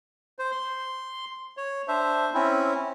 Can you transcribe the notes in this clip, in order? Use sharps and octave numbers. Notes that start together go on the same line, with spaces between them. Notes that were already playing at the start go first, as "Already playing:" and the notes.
C5
C6
C#5
D4 C5 E5
C4 C#4 E4